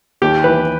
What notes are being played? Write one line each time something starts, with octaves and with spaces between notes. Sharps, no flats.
D#2 G4
E3 B4